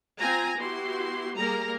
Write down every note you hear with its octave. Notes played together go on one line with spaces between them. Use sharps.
C4 F4 G#5 A#5
B3 E4 F#4 G4 C6
G3 A#3 G#4 A#4 A#5